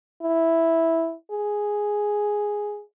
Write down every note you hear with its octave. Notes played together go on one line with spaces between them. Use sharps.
E4
G#4